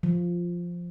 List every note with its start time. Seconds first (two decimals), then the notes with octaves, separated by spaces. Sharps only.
0.03 F3